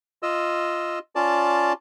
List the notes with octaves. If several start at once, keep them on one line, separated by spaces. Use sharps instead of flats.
F4 D#5 E6
C#4 F4 D5 A5